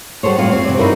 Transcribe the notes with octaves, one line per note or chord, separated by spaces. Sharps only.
G3 F#4 G#4 A4 C5 C#5
A2 C4 F4
C4 C#5
C3 E3 D5
D#4 E4 F#4 A4 A#4